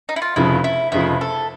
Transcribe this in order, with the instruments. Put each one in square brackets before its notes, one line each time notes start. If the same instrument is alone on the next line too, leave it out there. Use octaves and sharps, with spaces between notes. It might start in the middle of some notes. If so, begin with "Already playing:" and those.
[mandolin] D#4
E4
F4
[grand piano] F1 F2 C#3 F3 [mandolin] E4
[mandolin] E4
[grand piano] F1 F2 C#3 F3 [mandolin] E4
[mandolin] A4